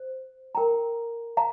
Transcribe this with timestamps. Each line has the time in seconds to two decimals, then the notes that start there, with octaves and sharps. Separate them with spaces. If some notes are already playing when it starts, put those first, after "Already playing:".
Already playing: C5
0.55 A#4 G5 A#5
1.37 F5 A#5